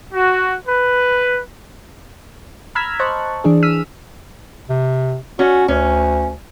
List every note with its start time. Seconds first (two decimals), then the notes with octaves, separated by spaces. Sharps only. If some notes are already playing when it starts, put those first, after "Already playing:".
0.13 F#4
0.65 B4
2.75 A#5 B5 E6 F6 G#6 B6
2.99 C5 D#5 A5 C#6 F#6
3.44 E3 D4 G#4
3.63 E6 F6 B6 D#7
4.69 C3
5.39 C#4 F#4
5.68 D2 C#4